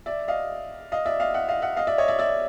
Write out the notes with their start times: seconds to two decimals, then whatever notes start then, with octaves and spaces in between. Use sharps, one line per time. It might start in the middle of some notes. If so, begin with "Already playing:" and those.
0.06 D5 E5
0.28 D#5 F5
0.92 D#5 F5
1.06 D5 E5
1.20 D#5 F5
1.34 E5 F#5
1.48 D#5 F5
1.62 E5 F#5
1.77 D#5 F5
1.87 D5 E5
1.98 C#5 D#5
2.08 D5 E5
2.19 D5 E5